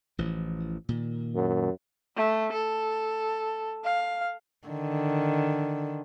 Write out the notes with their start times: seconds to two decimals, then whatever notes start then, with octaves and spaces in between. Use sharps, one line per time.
0.18 A1 E3 F3
0.89 A#2 D#3
1.35 F#2
2.16 A3
2.52 A4
3.84 F5
4.68 D3 D#3